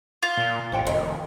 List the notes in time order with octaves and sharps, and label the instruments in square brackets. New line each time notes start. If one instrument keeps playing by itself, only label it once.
[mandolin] F4
[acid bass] A#2
[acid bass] A1 [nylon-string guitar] G2 C#5 G5
[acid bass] F1 [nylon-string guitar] D2 D#3